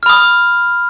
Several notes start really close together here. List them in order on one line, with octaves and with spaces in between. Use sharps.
F6 B5 D#6